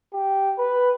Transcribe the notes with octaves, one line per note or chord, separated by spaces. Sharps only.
G4
B4